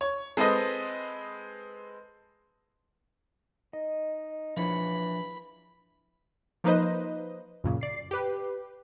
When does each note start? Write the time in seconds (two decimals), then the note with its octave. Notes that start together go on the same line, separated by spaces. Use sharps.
0.01 C#5
0.37 G#3 C4 A4 B4 D#5
3.73 D#4 D#5
4.57 E3 F3 D4 C#5 B5
6.64 F3 A#3 D#4 B4 C5 D#5
7.64 F#2 A#2 C#3
7.81 D5 C7
8.11 G4 B4